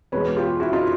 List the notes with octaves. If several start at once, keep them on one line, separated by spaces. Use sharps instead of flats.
E2 B2 G#3 B4 C#5
F4 G4
E4 F#4
D#4 F4